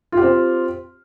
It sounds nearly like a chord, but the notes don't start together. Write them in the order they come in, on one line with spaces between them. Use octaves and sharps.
F4 G4 C4